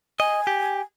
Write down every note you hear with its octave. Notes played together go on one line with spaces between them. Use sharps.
D#5 G#5
G4